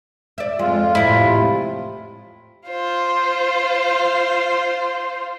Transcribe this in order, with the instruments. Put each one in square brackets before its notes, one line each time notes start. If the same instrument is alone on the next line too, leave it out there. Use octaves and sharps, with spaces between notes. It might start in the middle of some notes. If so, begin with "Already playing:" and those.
[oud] D5 E5
[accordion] F2 F4 [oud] G#3
[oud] E2 A2 C3 [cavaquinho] E4
[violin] F4 C5